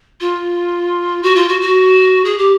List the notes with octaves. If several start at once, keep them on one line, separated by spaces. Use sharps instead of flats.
F4
F#4
F4
F#4
F#4
G#4
G4